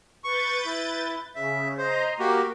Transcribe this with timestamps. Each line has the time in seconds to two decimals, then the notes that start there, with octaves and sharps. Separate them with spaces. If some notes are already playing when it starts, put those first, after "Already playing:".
0.24 B4 C#6 G6 A6
0.65 E4
1.35 C#3 E5
1.78 C5 D#5 A#5 C6
2.19 A#3 F#4 G4 A#4